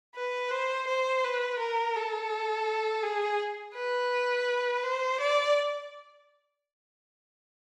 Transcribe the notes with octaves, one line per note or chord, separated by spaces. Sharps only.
B4
C5
C5
B4
A#4
A4
G#4
B4
C5
D5